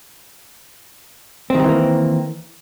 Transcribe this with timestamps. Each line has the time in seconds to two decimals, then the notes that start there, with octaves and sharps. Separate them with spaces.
1.50 C4
1.55 D#3
1.59 G3
1.64 E3
1.69 A#3